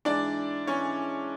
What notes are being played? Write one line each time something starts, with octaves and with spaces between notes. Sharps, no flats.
G#2 E3 D4 D5
E3 C#4 C#5